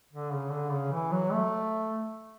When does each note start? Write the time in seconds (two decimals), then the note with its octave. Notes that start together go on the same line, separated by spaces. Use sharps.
0.13 D3
0.33 C#3
0.52 D3
0.72 C#3
0.92 E3
1.11 F#3
1.32 A3